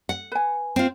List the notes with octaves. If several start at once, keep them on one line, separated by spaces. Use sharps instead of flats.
F#5
B4 G#5
C4 F4